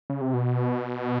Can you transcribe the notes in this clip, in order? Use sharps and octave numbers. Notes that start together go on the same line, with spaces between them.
C#3
C3
B2